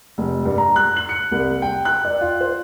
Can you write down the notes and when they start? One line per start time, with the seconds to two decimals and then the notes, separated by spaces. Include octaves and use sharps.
0.18 F1
0.45 G2
0.58 A#5
0.76 F#6
0.96 F#7
1.09 C#7
1.32 C2
1.62 G5
1.85 F#6
2.05 D5
2.21 F4
2.41 C5